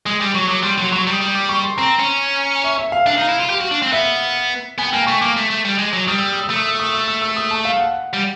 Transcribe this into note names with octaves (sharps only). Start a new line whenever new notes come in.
G#3 D#6
G3 D6
F#3 C#6
F#3 D6
G3 C6
F#3 C6
F#3 C#6
G3
D#6
G3
D6
C#6
C6
C4 A#5
C#4
E5
E5
F5
D4 F5
D#4
E4
F4
G4
F#4
D4
C4
B3 E5
B3 G#5
G5
A#3 G#5
A3 C#6
A#3 D6
A3
A3
G3
G#3
F#3
G3 D#6
E6
D#6
E6
A3
D#6
E6
D#6
E6
E6
E6
D#6
A5
F5
F#5
G3